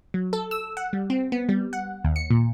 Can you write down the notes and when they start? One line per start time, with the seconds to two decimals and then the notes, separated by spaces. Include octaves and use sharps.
0.14 F#3
0.33 A4
0.51 E6
0.77 F#5
0.93 G3
1.10 C4
1.32 B3
1.49 G3
1.73 F#5
2.05 D#2
2.16 C#7
2.30 A#2